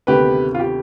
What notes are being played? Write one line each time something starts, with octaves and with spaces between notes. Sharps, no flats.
D2 C3 D#3 B3 G4 B4
F4
G4